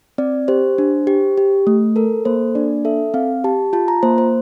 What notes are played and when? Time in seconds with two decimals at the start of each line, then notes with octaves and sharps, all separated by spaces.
0.18 C4 D5
0.48 G4 C5
0.78 D4
1.07 G4
1.38 G4
1.67 A3
1.96 A4 A#4
2.25 A#3 C5
2.55 D4 D5
2.85 A4 E5
3.14 C4 F5
3.44 G4 A5
3.73 F4 A5
3.88 A#5
4.03 A#3 C5
4.18 C5